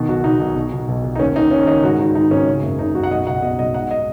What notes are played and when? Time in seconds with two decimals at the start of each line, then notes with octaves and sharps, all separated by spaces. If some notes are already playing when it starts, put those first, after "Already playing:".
Already playing: B2 D#3
0.08 B1 F#4
0.24 B2 D#4
0.40 B1
0.55 B1
0.72 B2
0.88 B1
1.04 B2
1.15 D#4
1.19 D#2 C#4
1.35 D#2 D#4
1.51 D#3 C#4
1.67 D#3 D#4
1.83 G#2 F#4
1.99 D#3 D#4
2.15 D#3 D#4
2.31 G#1 C#4
2.47 C#3
2.63 F#1
2.79 C#3 D#4
2.94 F#1 F#4
3.03 F#5
3.11 B1 D#5
3.27 B2 F#5
3.42 B2 D#5
3.59 B1 D#5
3.74 G#2 F#5
3.91 D#5